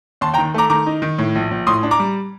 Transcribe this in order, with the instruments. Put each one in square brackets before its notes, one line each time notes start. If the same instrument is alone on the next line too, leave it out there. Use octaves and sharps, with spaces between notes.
[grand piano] D#2 A5 C6
G5 A#5
D#3
A3 A#5 D6
D#3 A#5 D6
D#4
D#3
A2
A#1
A#1
A2 C6 D#6
D4
A#5 D6
G3